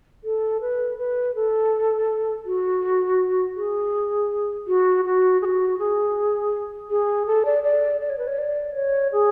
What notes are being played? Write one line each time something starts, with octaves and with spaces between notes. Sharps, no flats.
A4
B4
B4
A4
F#4
G#4
F#4
F#4
G#4
F#4
G#4
G#4
A4
D5
D5
D5
C#5
B4
C#5
D5
C#5
G#4